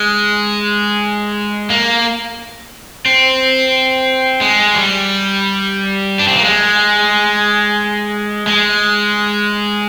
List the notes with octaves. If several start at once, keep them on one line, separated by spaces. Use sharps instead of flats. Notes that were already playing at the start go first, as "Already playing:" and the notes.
Already playing: G#3
A#3
C4
G#3
G3
D4
C4
A#3
G#3
G#3